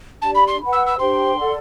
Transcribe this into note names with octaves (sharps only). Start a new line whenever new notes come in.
D4 G4 D5 A5
B5
C6
B4 F#5 B5
E6
E6
D4 G4 C5 G5 C6
A4 D5 F#5